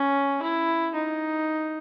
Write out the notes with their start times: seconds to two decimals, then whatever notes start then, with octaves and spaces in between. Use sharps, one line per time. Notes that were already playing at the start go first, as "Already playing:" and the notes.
Already playing: C#4
0.42 E4
0.95 D#4